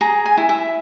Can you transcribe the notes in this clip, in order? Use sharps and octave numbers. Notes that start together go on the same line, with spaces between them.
G#4 A#5
G#5
E4
E5